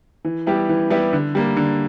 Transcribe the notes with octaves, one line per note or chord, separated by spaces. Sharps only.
E3
G3 B3 E4 G4
E3
G3 B3 E4 G4
D3
G3 A#3
D3